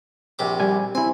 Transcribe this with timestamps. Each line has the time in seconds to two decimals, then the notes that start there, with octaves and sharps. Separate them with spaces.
0.39 A#1 C3 D6
0.60 G3 G#5
0.95 C4 E4 G#5